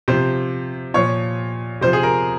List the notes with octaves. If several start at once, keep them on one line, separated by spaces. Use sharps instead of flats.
C3 F3 C5
A#2 F3 C#5
C3 F3 C5
G#4
A#4